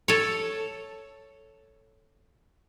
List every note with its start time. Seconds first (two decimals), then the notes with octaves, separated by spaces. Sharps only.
0.08 A4 C#5